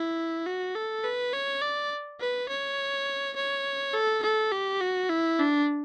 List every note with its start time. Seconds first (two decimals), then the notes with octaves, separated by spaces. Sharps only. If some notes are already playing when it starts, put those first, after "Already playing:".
Already playing: E4
0.46 F#4
0.75 A4
1.04 B4
1.33 C#5
1.62 D5
2.20 B4
2.49 C#5
3.36 C#5
3.94 A4
4.23 A4
4.52 G4
4.81 F#4
5.10 E4
5.39 D4